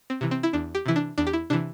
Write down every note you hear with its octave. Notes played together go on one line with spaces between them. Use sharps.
C4
C3 E3
C4
E4
E2 D4
G4
C3 E3 E4
D4
E2 D4
G4
E4
C3 E3 D4